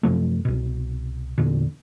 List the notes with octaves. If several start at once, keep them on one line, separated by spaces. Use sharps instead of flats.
F#2 C3 F3 A3
C2 B2
E2 A#2 D3